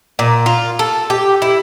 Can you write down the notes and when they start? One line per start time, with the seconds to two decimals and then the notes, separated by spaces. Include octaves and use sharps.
0.19 A#2
0.46 F4
0.79 A4
1.10 G4
1.42 E4